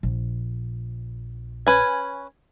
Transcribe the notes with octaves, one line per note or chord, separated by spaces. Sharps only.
A#1
C#4 B4 G#5